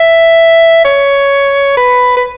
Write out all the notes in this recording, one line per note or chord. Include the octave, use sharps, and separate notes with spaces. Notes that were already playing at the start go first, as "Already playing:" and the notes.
Already playing: E5
C#5
B4
B4